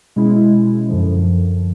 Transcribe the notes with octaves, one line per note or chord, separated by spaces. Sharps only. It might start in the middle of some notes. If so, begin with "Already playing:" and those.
B2 G#3 C#4 E4
F#2 D3 F3